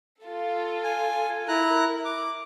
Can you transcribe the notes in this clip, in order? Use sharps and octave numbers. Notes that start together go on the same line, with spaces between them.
F4 A4
G#5
E4 A#4 A#5 F#6
D6